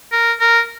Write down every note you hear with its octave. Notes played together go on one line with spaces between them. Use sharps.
A#4
A#4